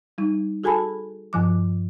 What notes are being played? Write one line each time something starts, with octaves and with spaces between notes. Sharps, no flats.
G3 D#4
F#4 G#4 A4 G#5 A5 B5
G2 F3 D6